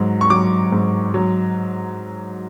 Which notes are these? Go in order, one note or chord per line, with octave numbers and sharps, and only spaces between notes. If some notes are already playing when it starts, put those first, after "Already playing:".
Already playing: G#2 F#3
C#6
F#3 D6
G#2
F#3